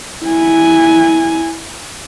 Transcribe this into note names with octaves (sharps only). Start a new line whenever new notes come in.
E4 G#5